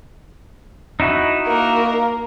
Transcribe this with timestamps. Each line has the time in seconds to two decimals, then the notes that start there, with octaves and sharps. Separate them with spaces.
1.00 D#4 E4 F#4
1.47 A#3 A#4